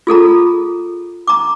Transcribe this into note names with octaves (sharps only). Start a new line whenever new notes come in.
F4 G#4 A4 A#5
A#5 D6